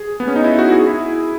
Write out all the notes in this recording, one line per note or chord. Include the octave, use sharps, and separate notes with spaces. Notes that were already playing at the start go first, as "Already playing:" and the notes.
Already playing: G#4
B3
C#4
D#4
E4
F#4
G#4
E4